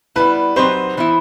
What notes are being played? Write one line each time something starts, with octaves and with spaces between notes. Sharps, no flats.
G3 B3 E4 B4
F#3 C4 D#4 G4 B4 C5
E3 B3 E4